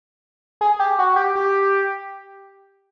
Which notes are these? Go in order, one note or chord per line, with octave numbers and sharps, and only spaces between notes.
G#4
G4
F#4
G4
G4